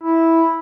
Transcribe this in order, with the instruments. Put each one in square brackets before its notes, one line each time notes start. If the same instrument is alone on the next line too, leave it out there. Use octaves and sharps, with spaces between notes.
[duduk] E4